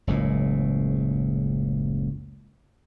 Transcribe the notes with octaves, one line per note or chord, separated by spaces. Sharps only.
F#1 C#2 A2